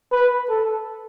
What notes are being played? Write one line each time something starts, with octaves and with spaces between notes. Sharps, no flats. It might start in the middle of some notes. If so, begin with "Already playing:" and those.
B4
A4